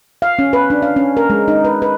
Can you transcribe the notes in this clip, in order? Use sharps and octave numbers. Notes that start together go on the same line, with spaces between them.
F5
C#4
B4
D4
F5
C#4
A#4
G#3
D#4
B4
B4